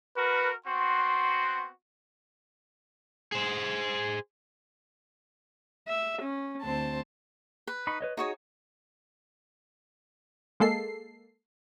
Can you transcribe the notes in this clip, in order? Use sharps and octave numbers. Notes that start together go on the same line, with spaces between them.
F#4 A#4 B4
B3 C4 F#4 C6
G#4 C5
E5
C#4
D2 C4 C5 A5
B4
D#4 B5 C#6
B4 C#5 D#5
D#4 F#4 G#4 C#5
G#3 A#3 A4 C7